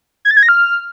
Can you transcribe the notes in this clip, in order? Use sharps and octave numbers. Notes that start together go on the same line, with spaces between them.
G#6
A6
G#6
A#6
F6